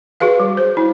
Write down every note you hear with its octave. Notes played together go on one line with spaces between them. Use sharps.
F#4 G#4 B4 F5
G3
C5
E4